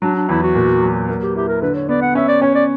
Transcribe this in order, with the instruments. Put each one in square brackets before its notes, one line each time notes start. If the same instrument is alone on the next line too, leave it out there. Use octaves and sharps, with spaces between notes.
[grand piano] F#3 [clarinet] D4
[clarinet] D4
[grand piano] E2 [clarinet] E4
[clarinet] F#4
[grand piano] A#2
F#3
A#3
[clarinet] G4
[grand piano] E4 [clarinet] G4
[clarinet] A#4
[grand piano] D3 [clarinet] B4
[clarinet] C#5
[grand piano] B3 [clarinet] D5
[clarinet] F#5
[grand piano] C#4 [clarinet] E5
[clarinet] D5
[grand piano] C#4 [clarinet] C#5
[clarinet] D5